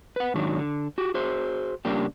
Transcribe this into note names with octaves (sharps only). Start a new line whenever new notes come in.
B4 F#5
G#2 D#3 F#3 D4
D3
F#4 G4
F#4 G#4 C5
C#3 G3 A#3 D4 G4